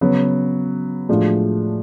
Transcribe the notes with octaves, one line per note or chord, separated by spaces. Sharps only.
C#3 F#3 B3
A2 F3 G#3 D4 F#4